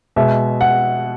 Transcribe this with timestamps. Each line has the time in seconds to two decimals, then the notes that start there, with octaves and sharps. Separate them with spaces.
0.16 B2 G#3 E5
0.61 F#5